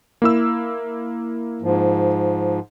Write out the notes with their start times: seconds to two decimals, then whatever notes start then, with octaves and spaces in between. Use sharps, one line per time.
0.22 A#3 E4 E6
1.62 G#2 F3